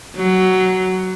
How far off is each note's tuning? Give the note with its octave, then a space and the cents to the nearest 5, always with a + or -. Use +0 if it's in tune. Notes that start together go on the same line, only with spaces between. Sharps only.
F#3 +10